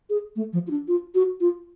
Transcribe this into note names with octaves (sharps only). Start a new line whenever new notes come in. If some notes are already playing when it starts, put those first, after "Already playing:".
G#4
A3
F3
F4
D4
F4
F#4
F4